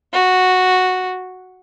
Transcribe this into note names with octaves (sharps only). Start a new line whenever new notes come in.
F#4